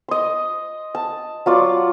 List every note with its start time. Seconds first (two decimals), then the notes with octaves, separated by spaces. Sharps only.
0.08 D#5 C6
0.95 A5
1.46 F#3 F4 D5